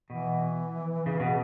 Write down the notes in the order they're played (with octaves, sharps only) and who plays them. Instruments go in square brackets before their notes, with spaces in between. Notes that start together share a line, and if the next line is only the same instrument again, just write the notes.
[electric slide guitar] B2 [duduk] E3
[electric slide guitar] C#3
B2